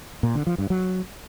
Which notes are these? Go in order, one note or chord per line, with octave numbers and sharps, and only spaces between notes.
A#2
D3
F3
G2
F#3